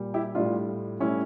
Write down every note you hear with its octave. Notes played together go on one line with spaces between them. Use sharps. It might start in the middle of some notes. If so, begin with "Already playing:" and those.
Already playing: A#2 G3
E4 G4
A2 G3 D4 F4
A2 G3 C#4 E4